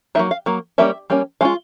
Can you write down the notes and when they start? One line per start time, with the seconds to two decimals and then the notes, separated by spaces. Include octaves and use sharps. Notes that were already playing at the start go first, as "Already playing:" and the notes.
0.15 F#3 A#3 D#4 E5
0.31 F5
0.46 F#3 A#3
0.78 G3 A#3 C#4 E5
1.10 G3 A#3 C#4
1.41 G#3 C#4 F4 F5